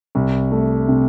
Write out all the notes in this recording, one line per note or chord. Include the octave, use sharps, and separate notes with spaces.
C2
A3
C3